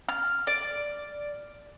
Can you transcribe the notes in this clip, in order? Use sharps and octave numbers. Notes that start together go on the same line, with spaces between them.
F6
D5